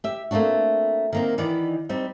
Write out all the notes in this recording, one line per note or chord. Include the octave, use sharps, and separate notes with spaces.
G4 E5
A3 A#3 C4 D4 F#4
D#3 A#3 C4
D#3 E3 B3 D#4 D5
G3 C4 D#4